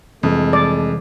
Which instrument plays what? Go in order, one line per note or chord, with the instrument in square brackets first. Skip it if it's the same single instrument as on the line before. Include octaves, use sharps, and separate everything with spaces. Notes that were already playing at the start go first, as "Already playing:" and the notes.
[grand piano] F2 [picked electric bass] C3 E3 G3 [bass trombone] G#3
[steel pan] D5